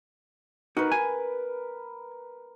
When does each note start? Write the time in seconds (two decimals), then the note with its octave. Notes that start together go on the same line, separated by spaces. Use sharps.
0.77 D#4 F#4 A#4 B4
0.92 G#5